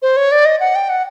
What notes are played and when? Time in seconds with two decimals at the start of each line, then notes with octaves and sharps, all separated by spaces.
0.02 C5
0.17 C#5
0.32 D5
0.45 D#5
0.60 F#5
0.75 G5
0.89 F#5